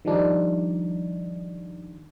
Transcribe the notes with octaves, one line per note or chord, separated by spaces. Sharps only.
D#3 F3 G3 D4 D#4